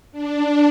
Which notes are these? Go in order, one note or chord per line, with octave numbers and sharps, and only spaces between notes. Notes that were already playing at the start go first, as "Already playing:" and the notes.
D4